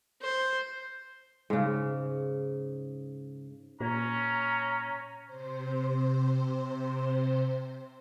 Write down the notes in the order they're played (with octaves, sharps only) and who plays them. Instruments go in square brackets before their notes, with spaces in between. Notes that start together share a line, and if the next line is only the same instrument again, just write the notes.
[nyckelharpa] C5
[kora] G#2 C#3
[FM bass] A#2 [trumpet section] C#4 C#5 A#5
[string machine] C3 C5